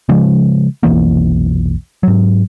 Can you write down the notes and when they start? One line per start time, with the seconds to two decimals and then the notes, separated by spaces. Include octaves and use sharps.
0.09 C#3 F3 G#3
0.83 F1 B1 E3 A#3
2.03 G#2 F#3